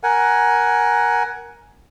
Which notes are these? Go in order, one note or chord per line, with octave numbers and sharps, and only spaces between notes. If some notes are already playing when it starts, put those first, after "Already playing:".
A#4 F#5 G#5